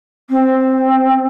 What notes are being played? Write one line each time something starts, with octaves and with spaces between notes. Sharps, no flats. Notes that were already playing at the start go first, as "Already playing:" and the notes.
C4